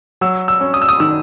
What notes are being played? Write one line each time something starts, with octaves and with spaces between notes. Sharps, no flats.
F#3 E6
E6
C#4
D#6
E6
D#6
D#3 E6